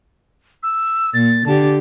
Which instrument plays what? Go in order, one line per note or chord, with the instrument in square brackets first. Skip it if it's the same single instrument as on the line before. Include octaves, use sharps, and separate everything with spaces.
[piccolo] E6
[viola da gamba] A#2 [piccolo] A6
[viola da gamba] D3 G4 [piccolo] A5